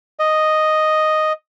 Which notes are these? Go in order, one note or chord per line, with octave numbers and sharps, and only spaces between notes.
D#5